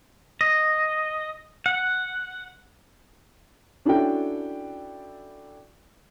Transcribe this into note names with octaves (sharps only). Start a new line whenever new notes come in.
D#5
F#5
C#4 D4 E4 F#4 A4 G5